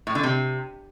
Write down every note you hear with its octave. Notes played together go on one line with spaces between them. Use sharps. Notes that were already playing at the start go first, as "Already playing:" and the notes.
A2
D3
C3